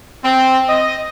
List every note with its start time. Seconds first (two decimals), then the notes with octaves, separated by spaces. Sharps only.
0.24 C4
0.68 D#5